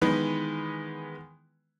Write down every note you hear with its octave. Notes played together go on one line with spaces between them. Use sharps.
D#3 E3 G#3 B3 B4